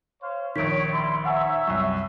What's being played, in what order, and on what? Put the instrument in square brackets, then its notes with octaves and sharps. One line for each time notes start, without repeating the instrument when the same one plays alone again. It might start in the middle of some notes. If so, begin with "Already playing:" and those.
[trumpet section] C5 C#5 F5
[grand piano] A#1 D#3 [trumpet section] C#5 [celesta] B6 D7
[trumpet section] G3 E4 C6
[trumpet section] C#5 E5 [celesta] F#5 G#5 A#5
[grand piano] C2 F#2 [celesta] C#6